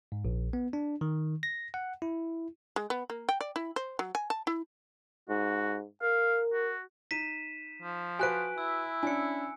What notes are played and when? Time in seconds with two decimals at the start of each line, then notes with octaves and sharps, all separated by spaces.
0.12 G#2
0.25 A#1
0.53 B3
0.73 D4
1.01 D#3
1.43 A#6
1.74 F#5
2.02 E4
2.76 G#3
2.90 B3
3.10 A#3
3.29 G5
3.41 D5
3.56 E4
3.76 C5
3.99 F#3
4.15 G#5
4.30 A5
4.47 E4
5.29 G#2 F#4
6.02 A#4 F5
6.53 F#4
7.11 D#4 B6 D#7 E7
7.82 F3
8.19 F#4 B4 G#5 F#6 D7
8.58 E4 E6
9.03 C#4 D4 G#5 C#7